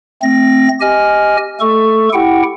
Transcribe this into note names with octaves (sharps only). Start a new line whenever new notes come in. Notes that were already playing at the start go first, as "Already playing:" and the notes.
A3 C4 A#6
G4 D#5 G#5 F6
A3 A4 C#6
E4 G4 F#5 G5